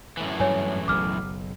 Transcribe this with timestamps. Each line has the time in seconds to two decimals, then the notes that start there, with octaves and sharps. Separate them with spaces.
0.17 F#2 A2 E3
0.40 G2 F#3 C#5 G#5
0.88 F#1 B1 D6 F6